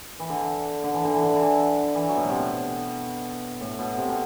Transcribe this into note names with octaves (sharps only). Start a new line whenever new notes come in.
E3
D3
D3
E3
D3
E3
D3
E3
D3
E3
F#3
B2
A2
C3
B2
A2
B2
C3
B2